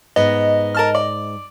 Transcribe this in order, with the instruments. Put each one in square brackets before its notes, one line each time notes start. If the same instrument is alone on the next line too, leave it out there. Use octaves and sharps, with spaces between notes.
[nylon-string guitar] G#2 [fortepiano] B3 [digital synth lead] D#5
[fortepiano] A#4 A5 F6
D5